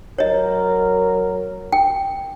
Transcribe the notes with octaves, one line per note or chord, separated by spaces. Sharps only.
F#3 A#4 C#5 D#5
G5